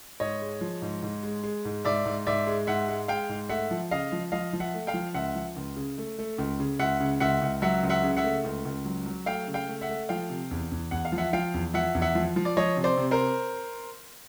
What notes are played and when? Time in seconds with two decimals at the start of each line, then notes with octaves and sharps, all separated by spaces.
0.20 G#2 C#5 D#5
0.42 G#3
0.61 F3
0.82 G#2
1.03 G#2
1.23 G#3
1.43 G#3
1.65 G#2
1.85 G#2 D5 E5
2.05 G#2
2.27 G#2 D5 E5
2.47 G#3
2.67 G#2 E5 F#5
2.88 G#3
3.08 G#3 F5 G5
3.29 G#2
3.49 A3 E5 F#5
3.71 F3
3.91 C#3 D#5 F5
4.12 F3
4.32 F3 D#5 F5
4.53 F3
4.60 E5 F#5
4.74 A3
4.87 F5 G5
4.94 F3
5.14 C#2 E5 F#5
5.35 F3
5.56 C#2
5.76 C#3
5.98 A3
6.18 A3
6.38 C#2
6.60 C#3
6.79 C#2 E5 F#5
7.00 C#3
7.20 C#2 E5 F#5
7.42 C#2
7.62 F#3 E5 F#5
7.83 C#2
7.90 E5 F#5
8.03 C#3
8.17 E5 F#5
8.24 A3
8.44 C#2
8.65 C#2
8.85 F#3
9.06 F#3
9.26 A3 F5 G5
9.47 C#3
9.54 F5 G5
9.68 A3
9.81 E5 F#5
9.89 A3
10.09 F3 F5 G5
10.30 C3
10.51 E2
10.72 E2
10.91 E2 F#5
11.05 F5
11.12 F3
11.18 E5 F#5
11.33 F3 F5 G5
11.54 E2
11.74 F3 E5 F#5
11.95 E2
12.02 E5 F#5
12.15 F3
12.36 F3
12.45 D5
12.57 F3 C#5 D#5
12.77 C3
12.84 C5 D5
12.97 C3
13.11 A#4 C5